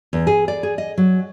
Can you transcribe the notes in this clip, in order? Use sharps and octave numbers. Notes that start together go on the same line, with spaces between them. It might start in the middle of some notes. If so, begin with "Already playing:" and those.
E2
G#4
D5
G#4
D#5
F#3